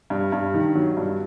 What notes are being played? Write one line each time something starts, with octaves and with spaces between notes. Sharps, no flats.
G2
G2
D#3
F#3
G2